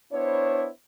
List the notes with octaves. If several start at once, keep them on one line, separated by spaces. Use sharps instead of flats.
B3 D4 E4 C5 C#5